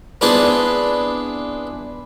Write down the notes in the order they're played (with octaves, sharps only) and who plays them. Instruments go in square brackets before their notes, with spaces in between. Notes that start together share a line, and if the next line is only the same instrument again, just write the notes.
[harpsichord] B3 C4 D4 E4 G#4 B4